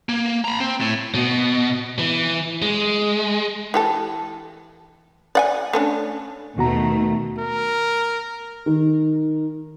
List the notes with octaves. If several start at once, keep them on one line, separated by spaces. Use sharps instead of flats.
A#3
A#5 B5
C4
A2
B2
E3
G#3
E3 G4 A4
D5 F#5 G#5
A3 C#4 D4
D#2 B2 D#3 A3 F#4 A#5
A#4
D#3